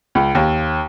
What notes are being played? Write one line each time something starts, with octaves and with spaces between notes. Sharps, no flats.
C#2
D#2